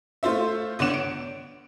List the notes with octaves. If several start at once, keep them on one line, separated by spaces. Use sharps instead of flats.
A3 F4 C5 E5
G1 D3 C#5 D5 E7
D7